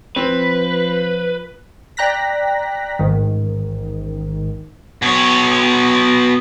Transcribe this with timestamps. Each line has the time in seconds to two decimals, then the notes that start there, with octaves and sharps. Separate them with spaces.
0.16 F3 C4 B4
1.97 D5 G5 A#5 F#6 A#6 B6
2.99 A1 G#2 D#3
5.02 B2 C#5